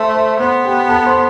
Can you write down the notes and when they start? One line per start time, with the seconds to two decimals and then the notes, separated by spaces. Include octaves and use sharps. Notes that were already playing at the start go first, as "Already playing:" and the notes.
Already playing: A3 C5 C6
0.15 C5 C6
0.39 B3 C5 C6
0.65 G4 G5
0.89 A4 A5
1.06 C5 C6